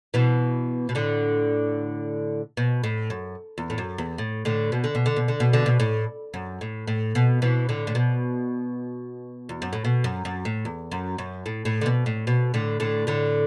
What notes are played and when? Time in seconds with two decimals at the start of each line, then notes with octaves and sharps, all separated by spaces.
0.14 B2 E3
0.89 B2
0.95 A2 D3
2.57 B2
2.84 A2
3.10 F#2
3.58 E2
3.70 A2
3.78 F#2
3.98 E2
4.18 A2
4.45 A2 D3
4.72 B2
4.84 D3
4.95 B2
5.06 D3
5.16 B2
5.28 D3
5.40 B2
5.53 D3
5.66 B2
5.80 A2
6.34 F#2
6.61 A2
6.87 A2
7.15 B2
7.42 B2 E3
7.69 A2 D3
7.87 A2
7.95 B2
9.49 E2
9.62 F#2
9.73 A2
9.85 B2
10.04 F#2
10.25 F#2
10.45 A2
10.65 E2
10.92 F#2
11.18 F#2
11.46 A2
11.65 A2
11.81 D3
11.86 B2
12.06 A2
12.27 B2
12.54 A2 D3
12.80 A2 D3
13.07 A2 D3